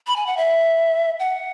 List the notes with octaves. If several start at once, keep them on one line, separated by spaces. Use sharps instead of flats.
B5
G#5
F#5
E5
F#5